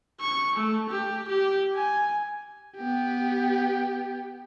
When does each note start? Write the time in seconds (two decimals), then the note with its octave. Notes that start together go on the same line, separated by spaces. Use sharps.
0.20 C#6
0.56 A3
0.90 G4
1.28 G4
1.75 G#5
2.77 B3 G4